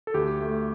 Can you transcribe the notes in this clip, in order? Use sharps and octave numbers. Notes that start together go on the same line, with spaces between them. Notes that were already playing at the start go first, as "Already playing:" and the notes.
A4
D2 G4
A3